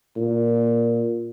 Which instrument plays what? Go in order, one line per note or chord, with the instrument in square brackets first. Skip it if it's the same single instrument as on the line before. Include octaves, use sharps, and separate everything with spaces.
[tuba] A#2